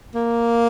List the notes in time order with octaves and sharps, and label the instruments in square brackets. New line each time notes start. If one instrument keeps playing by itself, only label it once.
[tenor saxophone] A#3